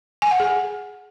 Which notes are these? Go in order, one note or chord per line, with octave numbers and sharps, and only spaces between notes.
G#5
F#5
G#4